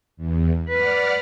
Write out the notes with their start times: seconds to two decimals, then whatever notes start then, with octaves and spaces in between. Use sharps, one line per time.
0.17 E2
0.69 B4 D5 F#5 F6